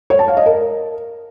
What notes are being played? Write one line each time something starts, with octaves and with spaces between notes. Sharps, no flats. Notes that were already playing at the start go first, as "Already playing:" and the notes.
C#5
A5
F5
D#5
A#4